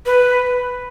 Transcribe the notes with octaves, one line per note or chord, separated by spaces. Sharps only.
B4